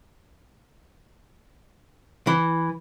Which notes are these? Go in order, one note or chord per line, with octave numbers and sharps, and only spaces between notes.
E3